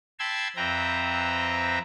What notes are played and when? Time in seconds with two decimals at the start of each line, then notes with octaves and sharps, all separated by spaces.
0.19 G5 A5 B5 C6 E6 G#6
0.56 F2 C4 B4 E5 G5 A#5